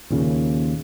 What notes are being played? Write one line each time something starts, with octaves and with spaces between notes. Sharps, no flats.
D#2 A#2 C#3